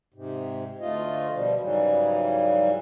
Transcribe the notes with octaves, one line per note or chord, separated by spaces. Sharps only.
G#2 C3
D2 A3 F4 D#5
B2 F3 G3
G#2 C#3 E3 F#3 G3